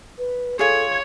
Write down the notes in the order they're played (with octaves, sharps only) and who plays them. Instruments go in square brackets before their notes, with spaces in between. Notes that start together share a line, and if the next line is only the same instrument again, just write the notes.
[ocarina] B4
[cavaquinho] F4 G#4 [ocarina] A4 [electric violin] C#5 G#6